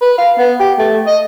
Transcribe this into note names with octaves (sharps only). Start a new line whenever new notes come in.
B4
F5
B3
G4
A3
D#5